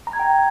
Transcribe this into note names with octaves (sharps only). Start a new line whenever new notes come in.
A#5
G#6
G5